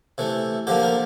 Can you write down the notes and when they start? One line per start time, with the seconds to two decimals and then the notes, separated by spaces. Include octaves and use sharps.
0.18 C3 E3 A3
0.67 D3 F3 A#3 G4
0.83 A#4